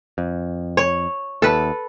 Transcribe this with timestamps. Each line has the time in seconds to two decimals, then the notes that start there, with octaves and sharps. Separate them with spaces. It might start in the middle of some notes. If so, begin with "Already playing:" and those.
0.18 F2
0.77 C#5
1.42 D#2 A4 B4